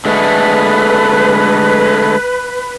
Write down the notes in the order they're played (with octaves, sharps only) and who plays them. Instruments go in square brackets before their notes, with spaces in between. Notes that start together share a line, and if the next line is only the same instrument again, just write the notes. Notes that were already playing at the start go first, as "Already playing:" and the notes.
[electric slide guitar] D3 G#3 A3 [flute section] B4